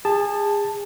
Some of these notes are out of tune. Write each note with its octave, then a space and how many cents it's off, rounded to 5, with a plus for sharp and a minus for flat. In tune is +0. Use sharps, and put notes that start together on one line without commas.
G#4 -30 A5 +0